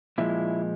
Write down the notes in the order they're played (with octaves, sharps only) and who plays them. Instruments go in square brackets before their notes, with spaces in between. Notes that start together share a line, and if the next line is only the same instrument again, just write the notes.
[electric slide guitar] A#2 F3 G#3 E4